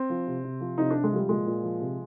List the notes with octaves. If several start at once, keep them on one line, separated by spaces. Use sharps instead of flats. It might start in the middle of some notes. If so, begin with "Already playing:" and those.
Already playing: C4
F3
C3
C3
F3
C3 D#4
C3 D4
G#3
F3 G3
A#2 G#3
A#2
F3
C3